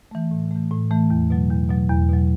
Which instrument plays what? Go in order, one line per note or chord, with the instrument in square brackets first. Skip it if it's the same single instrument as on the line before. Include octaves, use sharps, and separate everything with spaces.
[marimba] E3 A3
A2
E3 A3
A2
E3 A3
E2
B2 F#3
E2
B2 F#3
E2
B2 F#3